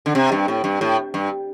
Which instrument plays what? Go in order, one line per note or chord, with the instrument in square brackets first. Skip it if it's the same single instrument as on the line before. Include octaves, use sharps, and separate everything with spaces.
[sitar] D3
C3
G2
A2
G2
A2
G2